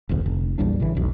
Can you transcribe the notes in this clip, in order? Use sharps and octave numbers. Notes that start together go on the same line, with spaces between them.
E1 A1 D2
F1
A#1 E2 G3 D4
A1 C#3 E3
F1 B1